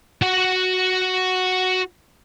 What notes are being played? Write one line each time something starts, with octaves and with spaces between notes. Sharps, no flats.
F#4 F#5